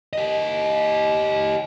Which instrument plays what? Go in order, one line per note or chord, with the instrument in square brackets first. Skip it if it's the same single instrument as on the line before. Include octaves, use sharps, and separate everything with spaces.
[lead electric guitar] G4 D#5